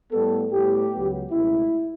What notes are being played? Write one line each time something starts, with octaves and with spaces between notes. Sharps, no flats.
A2 G3 B3 A4
A2 G3 B3 G4
C#2 C#3 F#3 B3
C#2 B2 A3 E4